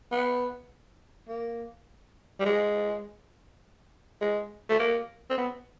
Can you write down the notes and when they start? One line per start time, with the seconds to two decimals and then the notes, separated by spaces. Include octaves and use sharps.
0.12 B3
1.29 A#3
2.40 G3
2.46 G#3
4.21 G#3
4.69 A3
4.79 A#3
5.30 C4
5.38 B3